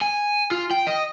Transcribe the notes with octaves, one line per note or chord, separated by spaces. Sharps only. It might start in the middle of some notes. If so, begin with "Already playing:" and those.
G#5
F4
G5
D#5